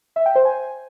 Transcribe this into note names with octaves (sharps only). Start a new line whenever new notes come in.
E5
G5
C5
G#5